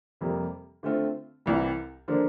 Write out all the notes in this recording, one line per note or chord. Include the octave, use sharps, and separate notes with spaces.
F2 C3 G3 A#3
D3 A3 C4 F4
C2 C3 E3 G3
D3 F3 A#3 D4